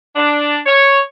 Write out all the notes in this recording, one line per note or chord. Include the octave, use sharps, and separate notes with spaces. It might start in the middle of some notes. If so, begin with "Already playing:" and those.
D4
C#5